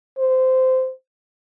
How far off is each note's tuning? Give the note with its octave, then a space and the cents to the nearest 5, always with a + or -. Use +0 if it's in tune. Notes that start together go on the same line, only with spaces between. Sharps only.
C5 -15